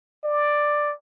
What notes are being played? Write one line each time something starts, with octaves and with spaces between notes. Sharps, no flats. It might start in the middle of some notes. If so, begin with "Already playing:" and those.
D5